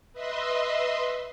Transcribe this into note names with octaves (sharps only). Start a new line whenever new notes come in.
B4 D#5 E5 C6